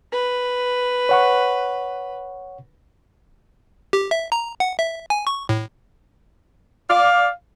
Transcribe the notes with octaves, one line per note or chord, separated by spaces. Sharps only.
B4
C#5 F#5 C#6
G4
E5
A#5
F#5
E5
G#5
C#6
A2
D5 F5